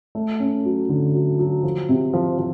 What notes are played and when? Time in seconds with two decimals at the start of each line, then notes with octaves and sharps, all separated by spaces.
0.15 A3
0.40 C#4
0.65 F#3
0.89 D3
1.14 F#3
1.39 F#3
1.63 F3
1.89 C3
2.13 F3
2.39 F3